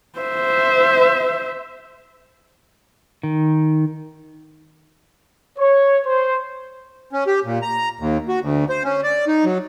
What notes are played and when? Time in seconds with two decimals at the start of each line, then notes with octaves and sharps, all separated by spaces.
0.19 C5 E5
3.23 D#3
5.59 C#5
6.06 C5
7.13 C#4
7.27 G4
7.45 A#2
7.62 A#5
8.00 D#2
8.28 F#4
8.41 D2
8.69 C5
8.84 C#4
9.03 D5
9.28 D#4
9.45 F#3